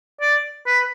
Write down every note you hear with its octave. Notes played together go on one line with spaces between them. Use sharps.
D5
B4